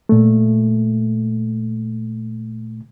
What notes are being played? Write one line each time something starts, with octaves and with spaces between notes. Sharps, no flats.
A#2 A3